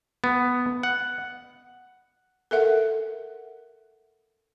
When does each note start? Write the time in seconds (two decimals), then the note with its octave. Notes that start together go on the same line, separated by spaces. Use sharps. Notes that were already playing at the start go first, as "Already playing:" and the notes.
0.24 B3
0.83 F#5
2.51 A4 A#4 E5 F#5